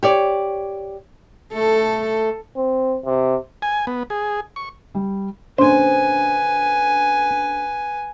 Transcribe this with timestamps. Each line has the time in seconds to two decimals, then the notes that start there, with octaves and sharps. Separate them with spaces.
0.03 G4 C#5 D5
1.54 A3 A4
2.56 C4
3.05 C3
3.62 G#5
3.87 B3
4.10 G#4
4.56 C#6
4.95 G3
5.58 A#1 D3 C#4 B4 C5 G#5